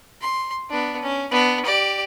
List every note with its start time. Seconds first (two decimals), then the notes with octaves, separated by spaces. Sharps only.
0.21 C6
0.70 B3 D4
1.02 C#4
1.32 B3 D4
1.66 G4 D5